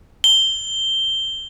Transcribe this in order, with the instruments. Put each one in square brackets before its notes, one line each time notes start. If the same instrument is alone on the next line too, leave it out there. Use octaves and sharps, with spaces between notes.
[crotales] G7